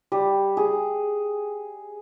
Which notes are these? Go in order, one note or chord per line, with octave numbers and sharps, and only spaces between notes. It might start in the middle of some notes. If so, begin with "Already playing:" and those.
G3
G#4